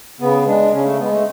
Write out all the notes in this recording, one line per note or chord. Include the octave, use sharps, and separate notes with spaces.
C#3 B3
G#3 D4
C#3 C#4
A3
G#3 B3
A3